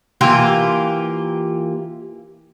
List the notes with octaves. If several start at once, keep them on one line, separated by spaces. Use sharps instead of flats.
E3 A#3 F4 G4